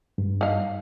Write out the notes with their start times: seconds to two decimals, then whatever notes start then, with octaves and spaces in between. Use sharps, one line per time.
0.18 G2
0.41 D#4 F5